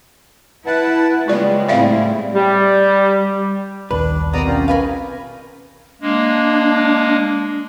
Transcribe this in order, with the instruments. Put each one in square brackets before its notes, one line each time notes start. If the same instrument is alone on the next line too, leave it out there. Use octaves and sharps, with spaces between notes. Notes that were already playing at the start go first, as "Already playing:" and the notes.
[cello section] E4 [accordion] B4 F#5 A5
[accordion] C#3 G3 [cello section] G#3 B3 [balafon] F4 D5
[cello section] A2 C4 E4 [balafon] D5 E5 F5
[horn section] G3
[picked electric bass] A#1 D#2 [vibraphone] G3 [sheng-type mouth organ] D4 [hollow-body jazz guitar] B4
[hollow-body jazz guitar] B2 C4 [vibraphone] A#4 [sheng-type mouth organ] D5 A#5 D#6
[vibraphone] C#4 [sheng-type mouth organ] F4 G4
[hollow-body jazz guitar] A#4 B4 F5 [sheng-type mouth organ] G#5
[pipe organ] G#3 A#3 [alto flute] D4